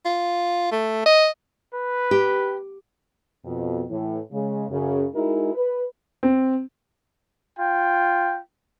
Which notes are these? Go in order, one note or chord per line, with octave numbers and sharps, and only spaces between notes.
F4
A3
D#5
B4
G4
F2 B2
A2 E3
C#3 G#3
F#2 C#3
G#3 D#4 E4 F#4 G#4 A#4
B4
C4
F4 G5